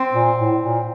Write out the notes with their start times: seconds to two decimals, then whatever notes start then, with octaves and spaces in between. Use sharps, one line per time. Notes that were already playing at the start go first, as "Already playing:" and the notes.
Already playing: C4
0.13 A#2
0.38 A2
0.62 A#2